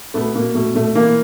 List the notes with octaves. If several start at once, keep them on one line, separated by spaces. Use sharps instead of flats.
B2 A3 B3
B2 A#3
B2 A3
B2 A3
E3 A#3